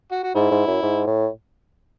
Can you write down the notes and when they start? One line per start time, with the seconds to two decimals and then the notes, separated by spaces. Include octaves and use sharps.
0.11 F#4
0.23 F#4
0.35 G#2 E4
0.51 G#2
0.67 F#2
0.83 G#2
1.07 A2